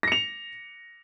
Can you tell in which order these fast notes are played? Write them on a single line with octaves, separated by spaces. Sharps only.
A#6 C#7 F7